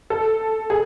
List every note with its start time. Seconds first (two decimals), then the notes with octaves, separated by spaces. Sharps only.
0.10 A4
0.70 G#4